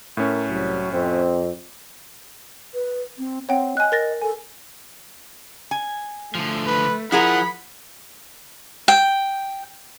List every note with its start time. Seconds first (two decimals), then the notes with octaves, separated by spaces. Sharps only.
0.17 A2 C#4 A#4
0.50 C2 F#3
0.93 F2 C4
2.74 B4
3.18 C4
3.49 C4 C#5 F#5 G5
3.77 D#5 G#5 F#6
3.92 A#4 A6 A#6
4.21 A4 G#5
5.71 G#5
6.35 D3 F3 A3
6.67 B4
7.12 F3 E4 G#4 A#4 F#5 B5
8.88 G5